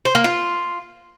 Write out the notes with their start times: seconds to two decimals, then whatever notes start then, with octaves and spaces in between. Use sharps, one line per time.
0.05 C5
0.15 A#3
0.24 F4